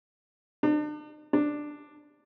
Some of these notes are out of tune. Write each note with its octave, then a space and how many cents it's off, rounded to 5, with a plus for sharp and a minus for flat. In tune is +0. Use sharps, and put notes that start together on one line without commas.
D4 +40
D4 +5